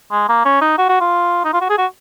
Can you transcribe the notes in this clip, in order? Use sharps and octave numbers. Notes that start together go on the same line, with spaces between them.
G#3
A#3
C#4
D#4
F#4
F#4
F4
D#4
F4
F#4
G#4
F#4